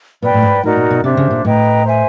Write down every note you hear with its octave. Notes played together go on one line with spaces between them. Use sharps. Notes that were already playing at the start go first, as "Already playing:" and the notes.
A#2 B4 D5 G5
A2
G#2
A2 D#4 F#4 A#4 D5
A#2
B2
C3 D4 G4 C5 E5
C#3
A#2
A2 B4 D#5 G5 A#5
C5 E5 G#5